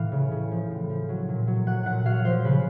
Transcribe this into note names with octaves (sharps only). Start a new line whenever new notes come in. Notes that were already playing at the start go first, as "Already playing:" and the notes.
Already playing: A2 E3 F5 G5
C#3
C#3
F3
A2
F3
F#3
A#2
F#3
F#3 F#5
A#2 F#5
F#3 F5
F3 C5
C#3 B4